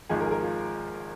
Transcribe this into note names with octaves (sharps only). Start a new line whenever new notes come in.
G#1 G#2 F3 G#3 G#4
A#4
G#4
A#4
F4